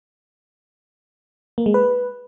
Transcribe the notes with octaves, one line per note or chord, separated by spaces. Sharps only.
A#3
G#3
B4